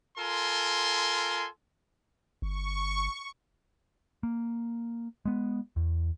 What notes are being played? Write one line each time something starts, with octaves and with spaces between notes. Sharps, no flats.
F4 A4 A#4 G#5 C6
G1 C#6
A#3
G#3 B3
E2